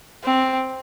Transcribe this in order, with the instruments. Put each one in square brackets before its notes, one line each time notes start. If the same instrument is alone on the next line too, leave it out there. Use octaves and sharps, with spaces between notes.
[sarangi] C4